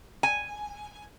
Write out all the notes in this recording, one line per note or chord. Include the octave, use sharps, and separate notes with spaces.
G#5